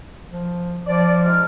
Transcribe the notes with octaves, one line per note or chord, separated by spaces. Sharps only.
F3
F3 D5
G#2 F6